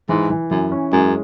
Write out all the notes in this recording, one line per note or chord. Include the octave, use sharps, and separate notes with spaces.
G#2 E3
E3
F#2 E3
C#4
F#2 G#3